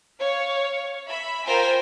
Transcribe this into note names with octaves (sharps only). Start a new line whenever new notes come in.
C#5 F5
E5 B5
F4 A#4 C5 G5 G#5